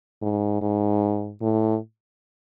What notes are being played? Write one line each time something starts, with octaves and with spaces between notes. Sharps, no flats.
G#2
G#2
A2